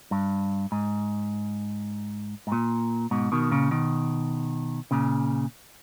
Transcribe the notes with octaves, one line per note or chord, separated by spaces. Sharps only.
G2
G#2
G#2
A#2
G#2 B2
B2 D#3
A#2 C#3
B2 D#3
A#2 C#3